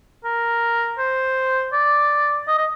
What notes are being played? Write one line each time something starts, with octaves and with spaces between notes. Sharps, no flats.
A#4
C5
D5
D#5
D#5